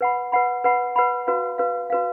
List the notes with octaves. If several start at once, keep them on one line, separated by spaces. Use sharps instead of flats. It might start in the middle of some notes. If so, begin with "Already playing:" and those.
B4 F#5 B5
B4 F#5 B5
B4 F#5 B5
B4 F#5 B5
F#4 B4 F5
F#4 B4 F5
F#4 B4 F5